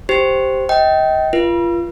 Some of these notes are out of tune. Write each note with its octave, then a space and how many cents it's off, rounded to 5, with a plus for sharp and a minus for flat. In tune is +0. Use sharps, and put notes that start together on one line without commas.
G4 +0 C5 +0 B5 +5
D#5 +30 G5 -20
F4 -25 B4 -40